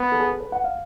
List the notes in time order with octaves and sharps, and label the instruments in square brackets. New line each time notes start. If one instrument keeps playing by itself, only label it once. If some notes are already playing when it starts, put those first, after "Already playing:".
Already playing: [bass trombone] B3
[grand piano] A4
G#4
A4
B4
F#5
F5